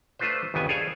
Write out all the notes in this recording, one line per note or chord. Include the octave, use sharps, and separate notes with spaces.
A3 D4 F4 B4 C5
G1 D#2 C#3 B3 G#5
G#4 A4 C5 D5 F5 G#5